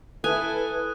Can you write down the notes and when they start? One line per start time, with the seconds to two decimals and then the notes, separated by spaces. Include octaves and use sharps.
0.24 E4 A4 B4 G#5 D#6 F#6